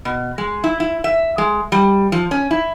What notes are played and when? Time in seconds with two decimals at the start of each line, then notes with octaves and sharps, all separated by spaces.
0.05 B2
0.38 G#3
0.64 E4
0.80 E4
1.04 E5
1.38 G#3
1.72 G3
2.12 F3
2.31 C#4
2.51 E4